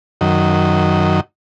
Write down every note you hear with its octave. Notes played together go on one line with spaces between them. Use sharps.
F#2 D#3